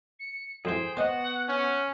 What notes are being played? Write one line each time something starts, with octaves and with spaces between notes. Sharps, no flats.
C#7
F2 E3 G#4 C5 G5
B3 F#4 C5 D#5 F#5
C#4 F#5